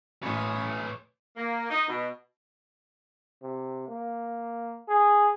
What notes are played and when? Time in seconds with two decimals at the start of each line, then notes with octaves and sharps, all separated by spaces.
0.23 A1 F#2 A2 B4 C#5 D#6
1.37 A#3
1.71 D#4
1.88 B2
3.43 C3
3.88 A#3
4.88 G#4